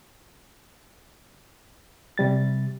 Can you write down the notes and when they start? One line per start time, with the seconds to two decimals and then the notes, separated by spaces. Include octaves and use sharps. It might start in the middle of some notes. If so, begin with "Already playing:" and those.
2.18 C3 G3 A6